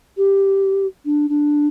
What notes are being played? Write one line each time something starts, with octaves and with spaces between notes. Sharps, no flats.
G4
D4
D4